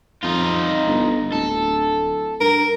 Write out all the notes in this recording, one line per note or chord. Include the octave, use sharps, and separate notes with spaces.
F2 D#4 F4
G1
D1 A4
G2 A#4